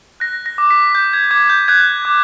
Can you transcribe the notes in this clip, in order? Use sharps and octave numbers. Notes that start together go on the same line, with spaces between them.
F#6 A#6
A#6
D6
B6
G6
G#6
D6 G#6
G6
F#6 G#6
D6